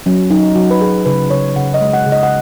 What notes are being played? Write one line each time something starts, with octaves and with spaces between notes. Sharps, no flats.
F#3 C#4
F#3 D#4
F#3 F#4
B4
F#3 G#4
C#3 B4
C#3 C#5
C#3 F#5
D#5
G#3
F#5
C#3
D#5
F#5